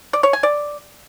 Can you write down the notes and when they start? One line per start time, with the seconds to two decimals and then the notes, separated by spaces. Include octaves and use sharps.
0.13 D5
0.23 C#5
0.33 G#5
0.43 D5